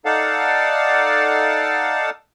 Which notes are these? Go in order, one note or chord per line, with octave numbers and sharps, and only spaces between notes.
D#4 A4 D5 F5 F#5 A5